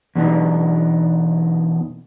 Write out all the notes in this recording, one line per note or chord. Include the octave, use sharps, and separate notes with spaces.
E2 B2 D4 D#4